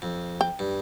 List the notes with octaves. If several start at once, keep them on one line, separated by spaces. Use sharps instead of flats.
F2
G5
G2